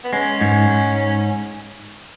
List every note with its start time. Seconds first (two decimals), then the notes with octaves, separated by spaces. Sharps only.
0.04 B3
0.13 G#3 C#4
0.41 G#2
0.69 G#2